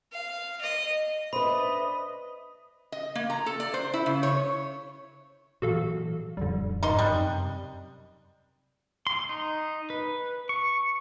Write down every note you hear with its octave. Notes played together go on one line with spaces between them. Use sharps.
F5
D#5
D4 B4 C5 D#5 E5 B5 D#6
D#5
A#3
A#5
A4
D5
C5
E4
C#3
C#5
A#2 E3 F#3 F#4 A4 F5
D1 F2 D3 G3
G#2 D#4 A#4 C6
F#2 C3 G3 D#6 F#6
C6
D#4
B4
C#6